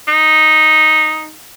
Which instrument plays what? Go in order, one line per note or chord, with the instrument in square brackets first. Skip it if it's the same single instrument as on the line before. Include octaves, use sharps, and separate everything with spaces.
[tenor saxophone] D#4